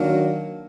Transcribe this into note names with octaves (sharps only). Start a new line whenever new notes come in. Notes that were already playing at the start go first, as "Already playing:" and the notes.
Already playing: D#3 F#3 A#3 D4